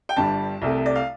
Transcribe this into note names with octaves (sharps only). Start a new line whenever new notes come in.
G5
G1 G2 G3 A5
C2 C3 A3
D5
F5